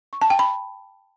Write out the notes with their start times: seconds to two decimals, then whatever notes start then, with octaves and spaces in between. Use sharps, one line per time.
0.13 C#6
0.22 A5
0.30 G5
0.39 B5